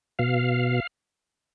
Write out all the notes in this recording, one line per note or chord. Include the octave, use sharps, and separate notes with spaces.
B2 F5